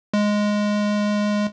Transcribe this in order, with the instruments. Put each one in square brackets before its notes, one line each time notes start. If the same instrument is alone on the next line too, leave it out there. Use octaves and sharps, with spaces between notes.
[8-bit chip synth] G#3